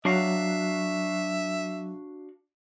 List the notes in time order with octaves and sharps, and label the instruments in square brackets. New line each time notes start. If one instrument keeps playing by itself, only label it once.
[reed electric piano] F#3 [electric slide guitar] D4 F#4 F5 [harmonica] E5